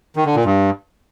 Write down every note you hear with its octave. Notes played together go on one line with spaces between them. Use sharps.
D#3
D3
A#2
G2